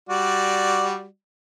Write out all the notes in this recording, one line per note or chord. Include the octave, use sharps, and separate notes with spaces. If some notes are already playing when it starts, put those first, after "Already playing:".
G3 F#4 D5